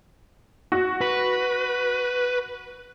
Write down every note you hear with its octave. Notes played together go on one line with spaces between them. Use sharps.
F#4
B4